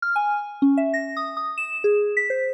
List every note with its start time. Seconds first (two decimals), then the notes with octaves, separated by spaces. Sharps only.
0.02 F6
0.16 G#5
0.62 C#4
0.77 E5
0.94 A#6
1.17 D#6
1.37 D#6
1.58 E7
1.84 G#4
2.17 B6
2.30 C5